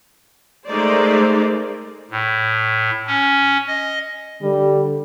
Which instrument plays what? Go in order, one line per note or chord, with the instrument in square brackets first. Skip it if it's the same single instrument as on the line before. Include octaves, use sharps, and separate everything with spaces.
[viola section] G#3 A3 D#4 A#4 C5 D5
[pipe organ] A2
C#4
D#5
[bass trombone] D3 [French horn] G3